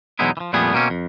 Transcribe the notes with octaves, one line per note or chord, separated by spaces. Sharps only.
E2 B2 F#3 G#3 D#4 E4
E3 F3
F2 A#2 G3 A3 B3 G#4
B2 A#3 C4 C#4
F2